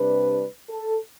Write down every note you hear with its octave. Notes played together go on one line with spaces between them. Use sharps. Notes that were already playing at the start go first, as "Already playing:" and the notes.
Already playing: C3 G3 D4 B4
A4